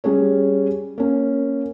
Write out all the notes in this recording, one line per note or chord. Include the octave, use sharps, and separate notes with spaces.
G3 C#4 G#4 C#5
A#3 C#4